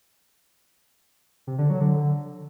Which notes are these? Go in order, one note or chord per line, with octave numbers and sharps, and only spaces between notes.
C3
D3
F#3
D3